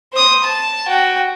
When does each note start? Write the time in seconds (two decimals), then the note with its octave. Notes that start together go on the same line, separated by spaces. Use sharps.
0.13 C5 D#6
0.44 A5
0.88 F#4 G5